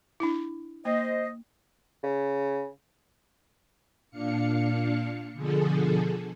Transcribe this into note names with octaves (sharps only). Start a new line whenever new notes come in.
D4 E4
A#3 C5 D#5
C#3
A#2 D4 F5 C#7
B2 D3 F3 G#4 A4